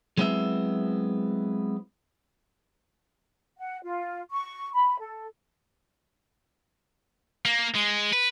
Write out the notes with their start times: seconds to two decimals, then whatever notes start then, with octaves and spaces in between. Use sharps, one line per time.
0.17 F#3 G#3 B3 C4 E4 E5
3.58 F#5
3.83 F4
4.31 C#6
4.74 B5
4.99 A4
7.45 A#3
7.75 G#3
8.12 B4